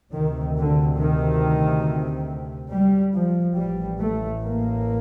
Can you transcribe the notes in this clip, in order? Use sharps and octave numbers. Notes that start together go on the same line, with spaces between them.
D2 C3 D#3
D3
D#3
G3
F3
A1 A2 G3
A3
A#3